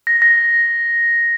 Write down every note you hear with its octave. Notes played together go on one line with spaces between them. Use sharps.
A#6
A#6